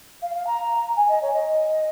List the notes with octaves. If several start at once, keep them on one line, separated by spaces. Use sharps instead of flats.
F5
F5
A#5
G#5
D#5
C#5
D#5